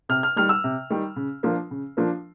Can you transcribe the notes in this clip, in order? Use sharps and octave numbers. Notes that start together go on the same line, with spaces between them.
C3 F6
F6
D#3 G3 F6
E6
C3
D#3 G3
C#3
F3 A#3 D4 F4
C#3
F3 A#3 D4 F4